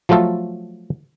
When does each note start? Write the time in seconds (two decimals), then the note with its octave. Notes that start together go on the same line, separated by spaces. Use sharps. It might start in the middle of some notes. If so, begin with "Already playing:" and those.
0.09 F3 F#3 A3 F4 A4